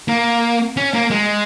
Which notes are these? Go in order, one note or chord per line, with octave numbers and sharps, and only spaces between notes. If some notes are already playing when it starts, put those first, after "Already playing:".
A#3
C#4
A#3
G#3